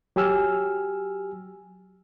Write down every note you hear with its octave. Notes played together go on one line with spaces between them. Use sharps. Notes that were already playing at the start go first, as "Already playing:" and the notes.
F#3 G4 G#5 E6 F6